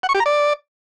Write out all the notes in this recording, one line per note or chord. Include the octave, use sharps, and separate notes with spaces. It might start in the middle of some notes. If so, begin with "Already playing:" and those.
F#5
C#6
G4
A#5
D5